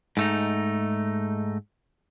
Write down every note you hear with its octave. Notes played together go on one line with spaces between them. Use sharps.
G#2 A3 D#4